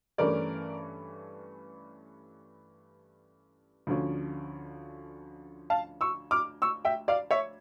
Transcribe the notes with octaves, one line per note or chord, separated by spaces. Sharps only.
G2 E3 A3 C#4 A#4 D5
D2 D3 F3 C#4
F5 A5
C#6 E6
D6 F6
C#6 E6
E5 G5
D5 F5
C#5 E5